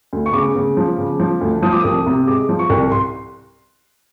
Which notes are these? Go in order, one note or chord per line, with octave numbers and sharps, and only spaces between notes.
D2
C#6
C#3 D6
C#3
F3
C#3
F3
D2
F3 D#6
D6
C2 D#6
C3
G#3 D6
F3
C#6
C2
C6